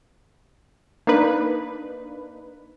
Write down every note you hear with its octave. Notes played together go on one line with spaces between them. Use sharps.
A#3 D4 D#4 B4